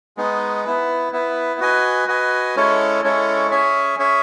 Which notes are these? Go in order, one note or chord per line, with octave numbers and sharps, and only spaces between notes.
G#3 B3 D#4
B3 E4 B4
B3 E4 B4
F#4 B4 D#5 G#5
F#4 B4 D#5 G#5
G#3 C#4 E4 A4 C#5
G#3 C#4 E4 A4 C#5
C#4 G#4 C#5 E5 G#5
C#4 G#4 C#5 E5 G#5